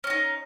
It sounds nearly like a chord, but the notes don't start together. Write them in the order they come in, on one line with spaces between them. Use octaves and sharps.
C#4 F#4 D#4